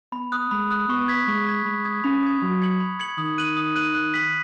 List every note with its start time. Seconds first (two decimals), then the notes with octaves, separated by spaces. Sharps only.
0.12 B3 B5
0.32 D#6 F#6
0.51 G#3 B5
0.71 D#6 F#6
0.89 B3 C#6
1.08 G#6 B6
1.28 G#3 C#6
1.47 G#6 B6
1.65 G#3 B5
1.85 D#6 G#6
2.04 C#4 B5
2.23 D#6 G#6
2.42 F#3 B5
2.62 G#6 C#7 F#7
2.80 B5
2.99 G#6 C#7 F#7
3.18 D#3 D#6
3.38 F#6 D#7 F#7
3.57 D#6
3.76 F#6 D#7 F#7
3.95 F#6
4.14 B6 F#7